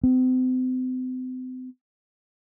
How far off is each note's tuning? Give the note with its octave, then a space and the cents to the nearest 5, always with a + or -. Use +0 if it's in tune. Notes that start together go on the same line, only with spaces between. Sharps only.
C4 -40